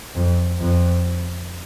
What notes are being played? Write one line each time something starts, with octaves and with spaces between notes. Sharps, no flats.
F2
F2